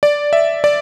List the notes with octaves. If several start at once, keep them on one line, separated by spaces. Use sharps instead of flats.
D5
E5
D5